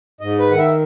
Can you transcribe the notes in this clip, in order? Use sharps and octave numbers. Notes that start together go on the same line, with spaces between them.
G#2 D#5
B4
D#3 F#5
E5